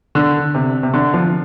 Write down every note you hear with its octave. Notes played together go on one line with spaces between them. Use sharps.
D3
C3
C3
D3
F3